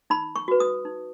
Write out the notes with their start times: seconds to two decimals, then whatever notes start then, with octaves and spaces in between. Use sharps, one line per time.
0.10 D#4 B5
0.36 C#6
0.48 F#4 B4
0.60 D#6
0.85 D#4